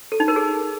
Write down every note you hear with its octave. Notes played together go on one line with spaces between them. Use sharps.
A4
D#4
A#4
G#4